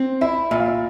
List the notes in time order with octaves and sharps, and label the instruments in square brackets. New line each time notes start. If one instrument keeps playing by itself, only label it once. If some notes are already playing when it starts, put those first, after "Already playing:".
Already playing: [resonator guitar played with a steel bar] C4
[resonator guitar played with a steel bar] E4 [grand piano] E5
[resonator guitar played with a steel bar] A#2 [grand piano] E5
[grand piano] F5
E5